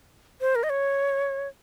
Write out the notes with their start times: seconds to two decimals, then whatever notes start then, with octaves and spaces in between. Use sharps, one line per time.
0.41 C5
0.55 A#4
0.63 D#5
0.70 C#5